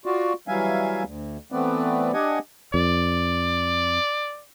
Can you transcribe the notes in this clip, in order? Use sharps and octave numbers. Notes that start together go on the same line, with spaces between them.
F4 F#4 D5
E3 F#3 G3 E5 F5 G#5
D2
E3 A3 B3 C4 B4 D5
D4 G4 D#5 F#5 G#5
F2 D5